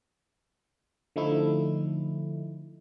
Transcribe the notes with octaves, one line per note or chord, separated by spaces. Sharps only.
D3 F3 A3 D#4 E4